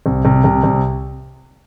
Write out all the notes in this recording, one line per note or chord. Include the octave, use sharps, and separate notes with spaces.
C2
C2
C2
C2